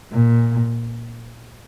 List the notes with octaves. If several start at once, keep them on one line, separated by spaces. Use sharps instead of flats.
A#2